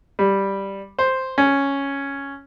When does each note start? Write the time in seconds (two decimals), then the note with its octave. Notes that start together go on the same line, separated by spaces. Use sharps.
0.19 G3
0.99 C5
1.38 C#4